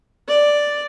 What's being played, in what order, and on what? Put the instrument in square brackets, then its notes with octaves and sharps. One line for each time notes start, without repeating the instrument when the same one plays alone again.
[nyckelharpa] D5